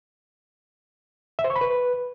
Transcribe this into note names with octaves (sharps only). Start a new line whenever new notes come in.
E5
C5
C#6
B5
B4